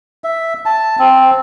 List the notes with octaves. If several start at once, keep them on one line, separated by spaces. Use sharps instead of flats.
E5
A5
C4